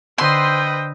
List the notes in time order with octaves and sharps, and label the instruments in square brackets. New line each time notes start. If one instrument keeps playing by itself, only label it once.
[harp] D3 E6 [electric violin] B4 D#5 [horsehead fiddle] C5 G5 [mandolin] C6